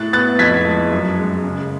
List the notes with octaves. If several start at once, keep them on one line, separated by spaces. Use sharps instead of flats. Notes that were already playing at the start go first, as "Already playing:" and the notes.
Already playing: A2 F#6 A6
B3 F#6 A6
F2 G#6 B6
G#3
F#2
G#3
C#3